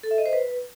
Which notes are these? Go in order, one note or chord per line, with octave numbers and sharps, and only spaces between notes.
A4
E5
D#5
C5
B4